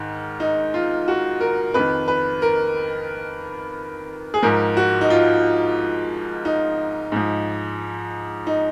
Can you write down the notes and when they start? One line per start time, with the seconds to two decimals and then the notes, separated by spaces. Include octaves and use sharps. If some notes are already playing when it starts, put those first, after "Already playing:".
Already playing: G#2 D#3
0.40 D#4
0.74 F4
1.08 F#4
1.40 A#4
1.74 F2 D#3 B4
2.08 B4
2.42 A#4
4.34 G#4
4.43 G#2 F3 A#4
4.77 F#4
5.01 D#4
5.10 F4
6.45 D#4
7.12 G#2 F3
8.47 D#4